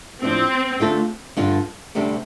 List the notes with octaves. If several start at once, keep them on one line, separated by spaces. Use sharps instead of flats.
A2 F3 C4 D4
D3 A3 F4 A4
G2 D3 G3 F4 A4
D2 C3 G3 D4 A4